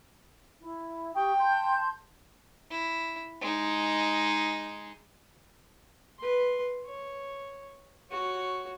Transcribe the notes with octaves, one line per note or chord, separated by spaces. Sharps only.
E4
G4 G5 C#6 D#6
A5 C6 G6
E4
G#3 D#4
B4 C6
C#5
F#4 C#5